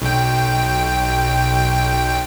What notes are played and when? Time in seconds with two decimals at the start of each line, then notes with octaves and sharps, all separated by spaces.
0.02 B1 G5